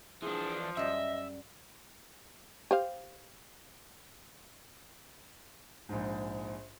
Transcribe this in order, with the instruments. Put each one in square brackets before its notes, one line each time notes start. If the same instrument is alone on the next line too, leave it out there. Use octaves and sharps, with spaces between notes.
[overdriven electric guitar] E3 D4 [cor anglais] F3 [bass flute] G#4
[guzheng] F#2 G3 [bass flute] D#5 [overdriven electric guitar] E5
[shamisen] G4 C5 F5
[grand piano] A#1 G#2